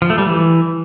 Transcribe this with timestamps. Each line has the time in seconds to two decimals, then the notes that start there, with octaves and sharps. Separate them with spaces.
0.02 F3
0.10 A3
0.18 G3
0.26 E3